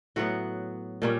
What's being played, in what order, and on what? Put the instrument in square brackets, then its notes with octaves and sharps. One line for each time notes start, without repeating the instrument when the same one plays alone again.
[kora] A2 F#3 B3 F#4
A#2 G3 A#3 C#4